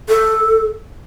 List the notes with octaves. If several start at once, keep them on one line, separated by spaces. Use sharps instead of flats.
A4